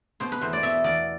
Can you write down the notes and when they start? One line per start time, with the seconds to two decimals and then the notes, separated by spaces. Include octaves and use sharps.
0.20 B2 C5
0.32 B4
0.41 E2 C5
0.53 D5
0.63 B2 E5
0.84 E2 D5